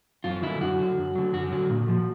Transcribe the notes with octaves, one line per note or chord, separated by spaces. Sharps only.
F#2 F4
D3 F#3 E4
F#2 F#4
D3 F#3
F#2
D3 F#3
F#2 F#4
D3 F#3
A#2
F3